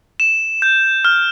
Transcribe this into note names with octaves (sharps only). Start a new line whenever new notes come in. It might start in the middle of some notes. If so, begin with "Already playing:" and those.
E7
G6
F6